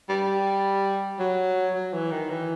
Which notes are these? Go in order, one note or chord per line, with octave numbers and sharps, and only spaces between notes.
G3
F#3
F#3
E3
D#3
E3